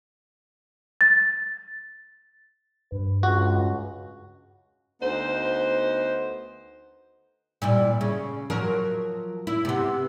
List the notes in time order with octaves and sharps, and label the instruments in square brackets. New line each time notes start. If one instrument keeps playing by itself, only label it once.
[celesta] A6
[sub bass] G2 [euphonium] B4
[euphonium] C#2 [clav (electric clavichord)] F#4
[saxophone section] D2 B3 D#4 C5
[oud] A#2 G3 E4
C#3
F3 F#3 A#4
E4
C3 B3